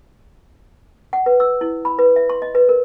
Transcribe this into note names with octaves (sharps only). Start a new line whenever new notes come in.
F#5
B4
E6
E4
B5
B4
E5
C6
D#5
B4
A#4